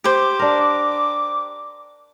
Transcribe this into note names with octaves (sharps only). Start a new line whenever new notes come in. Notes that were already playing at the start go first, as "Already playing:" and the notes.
G4 C5 D6
D4 A#4